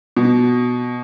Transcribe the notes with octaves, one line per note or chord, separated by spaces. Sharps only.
B2